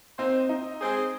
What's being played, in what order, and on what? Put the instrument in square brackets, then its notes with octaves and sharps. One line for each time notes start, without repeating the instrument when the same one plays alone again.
[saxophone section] A#3 D#4 C5 [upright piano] C4
[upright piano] D#4
[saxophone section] G#3 C4 G#4 C5